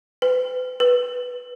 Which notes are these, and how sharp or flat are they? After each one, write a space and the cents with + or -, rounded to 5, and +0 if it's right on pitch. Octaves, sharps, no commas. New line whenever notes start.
B4 +35
B4 +0